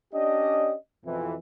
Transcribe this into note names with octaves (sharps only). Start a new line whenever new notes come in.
C#4 D4 G4 D5 D#5
F2 B2 E3